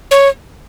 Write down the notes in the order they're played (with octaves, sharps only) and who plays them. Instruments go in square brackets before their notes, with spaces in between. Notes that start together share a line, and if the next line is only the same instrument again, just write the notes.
[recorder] C#5